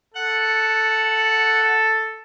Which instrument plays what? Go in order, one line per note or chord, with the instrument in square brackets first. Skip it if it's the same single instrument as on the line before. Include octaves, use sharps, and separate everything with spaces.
[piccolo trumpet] A4 [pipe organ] F#5